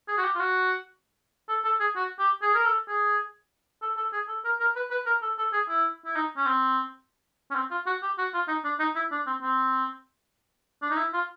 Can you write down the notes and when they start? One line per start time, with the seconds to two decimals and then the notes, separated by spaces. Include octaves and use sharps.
0.08 G#4
0.18 F#4
0.24 G4
0.35 F4
0.39 F#4
1.49 A4
1.64 A4
1.80 G#4
1.96 F#4
2.19 G4
2.42 G#4
2.54 A#4
2.65 A4
2.88 G#4
3.82 A4
3.97 A4
4.13 G#4
4.28 A4
4.44 A#4
4.60 A#4
4.76 B4
4.91 B4
5.06 A#4
5.22 A4
5.38 A4
5.53 G#4
5.69 E4
6.06 E4
6.16 D#4
6.37 C#4
6.46 C4
7.51 C#4
7.55 C4
7.70 F4
7.86 F#4
8.02 G4
8.18 F#4
8.34 F4
8.48 D#4
8.64 D4
8.79 D#4
8.96 E4
9.12 D4
9.27 C4
9.42 C4
10.82 D4
10.90 D#4
10.98 E4
11.13 F4